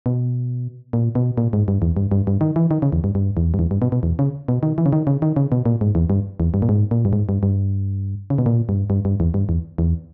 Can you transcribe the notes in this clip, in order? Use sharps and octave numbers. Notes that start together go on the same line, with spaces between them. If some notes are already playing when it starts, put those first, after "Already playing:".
B2
A#2
B2
A#2
G#2
G2
E2
G2
G2
G2
D#3
E3
D#3
C#3
E2
G2
G2
E2
G2
E2
G2
B2
B2
E2
C#3
B2
D#3
E3
C#3
D#3
C#3
D#3
C#3
B2
A#2
G#2
E2
G2
E2
G2
A#2
G#2
A#2
G2
G#2
G2
G2
C#3
B2
A#2
G2
G2
G2
E2
G2
E2
E2